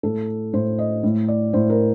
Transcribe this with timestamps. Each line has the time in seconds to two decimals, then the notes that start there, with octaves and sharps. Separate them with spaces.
0.03 A2 A4
0.53 A2 C5
0.78 D#5
1.03 A2
1.28 D5
1.53 A2 C5
1.70 A#4